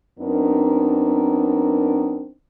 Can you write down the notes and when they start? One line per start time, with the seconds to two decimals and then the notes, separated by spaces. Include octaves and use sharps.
0.20 F#2 B3 C4 D4 D#4 A#4